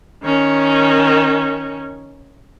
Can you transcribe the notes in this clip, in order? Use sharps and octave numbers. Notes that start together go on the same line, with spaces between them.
D#3 C#4